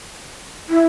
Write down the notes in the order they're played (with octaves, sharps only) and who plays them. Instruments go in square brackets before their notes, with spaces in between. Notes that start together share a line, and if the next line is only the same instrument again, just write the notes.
[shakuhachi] E4